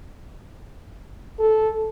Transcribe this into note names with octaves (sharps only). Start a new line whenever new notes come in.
A4